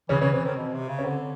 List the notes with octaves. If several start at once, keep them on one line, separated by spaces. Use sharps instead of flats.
C#3 E3 C#4
C#3 E3 C#4
E3 C4
D#3 C4
B2
C3
C#3
C#4
D3 C4